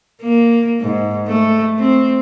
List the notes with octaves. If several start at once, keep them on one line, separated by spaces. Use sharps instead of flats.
A#3
G#2
A3
C4